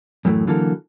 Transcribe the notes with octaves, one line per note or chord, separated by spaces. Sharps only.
F#2 A2 E3 G#3 A3
D3 E3 F#3 A#3 A4